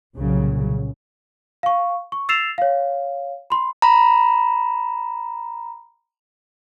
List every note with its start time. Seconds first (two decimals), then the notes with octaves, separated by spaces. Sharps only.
0.16 C2 A#2 C#3 F#3
1.63 F5 C#6
2.12 C#6
2.29 E6 A6 C7 E7 F7
2.58 C#5 F5
3.50 B5 C6
3.82 A#5 B5